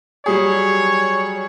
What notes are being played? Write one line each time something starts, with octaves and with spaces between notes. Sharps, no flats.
F#3 G3 G#4 C#5